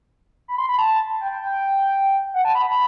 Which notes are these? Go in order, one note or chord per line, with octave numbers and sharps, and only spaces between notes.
B5
C6
B5
A5
G5
G5
G5
F#5
A5
B5
B5